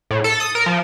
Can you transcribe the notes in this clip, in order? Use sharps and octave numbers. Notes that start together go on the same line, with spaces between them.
A2
A4
D#6
A#4
F3